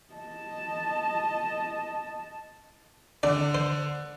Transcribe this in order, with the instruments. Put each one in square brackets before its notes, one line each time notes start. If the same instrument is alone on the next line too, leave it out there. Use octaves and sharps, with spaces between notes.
[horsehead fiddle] D#5 A5
[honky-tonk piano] D3 [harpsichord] D5
[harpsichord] C5